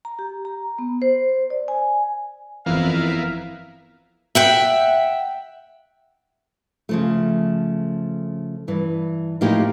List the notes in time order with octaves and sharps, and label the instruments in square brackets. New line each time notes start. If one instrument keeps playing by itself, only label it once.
[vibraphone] A#5
G4
A#5
B3
C5
D5
G#5
[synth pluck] G1 E3 [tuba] F2 [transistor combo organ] B3 E4 A#4 [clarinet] F5
[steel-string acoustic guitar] E5 F#5 G5
C#3 F3 A3
G2 E3
A2 F3 A#3 D#4 G4